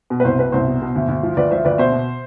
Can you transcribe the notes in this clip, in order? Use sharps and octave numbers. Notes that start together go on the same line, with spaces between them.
B2
B4
C2 C5
B2 B4
C2 C5
B2
B2
D2
D2
F3
D2 B4 D5
F3 C5 E5
D2 B4 D5
B2 C5 E5
B2